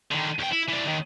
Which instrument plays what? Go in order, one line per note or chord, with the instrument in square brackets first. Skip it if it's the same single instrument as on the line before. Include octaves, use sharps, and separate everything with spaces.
[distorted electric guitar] D3 D#3
E2 G5
E4
E3 D4
D#2 D#3